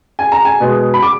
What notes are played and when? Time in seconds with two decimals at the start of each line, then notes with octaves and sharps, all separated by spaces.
0.19 G#5
0.32 A#5
0.45 G#5
0.60 B2 G#3
0.94 B5
1.02 D6